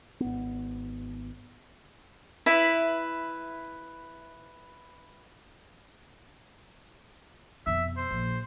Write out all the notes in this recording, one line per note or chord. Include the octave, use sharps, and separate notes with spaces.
G#1 B3
E4 B4 E5 B5
F2 B2 E5
C5
A#1